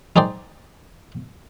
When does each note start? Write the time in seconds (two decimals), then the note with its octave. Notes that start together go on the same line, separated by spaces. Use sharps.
0.16 D#4 G#4 C5 D5 G5